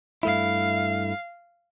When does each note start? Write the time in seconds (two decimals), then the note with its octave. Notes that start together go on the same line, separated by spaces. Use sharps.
0.23 G2 A3 E4 F5